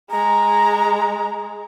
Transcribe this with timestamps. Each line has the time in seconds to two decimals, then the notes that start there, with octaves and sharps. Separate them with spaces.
0.11 G#3 A#5